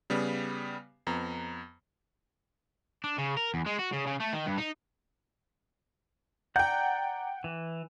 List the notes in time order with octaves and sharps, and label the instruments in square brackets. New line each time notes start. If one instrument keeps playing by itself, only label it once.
[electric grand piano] C#3 G3 B3
F2 B3 A#5
[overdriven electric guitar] D4
C#3
A#4
E2
G#3
F#4
C#3
C#3
A3
D#3
G2
D#4
[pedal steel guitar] D5 A#5 G6 [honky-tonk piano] F#5 G5
[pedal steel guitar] E3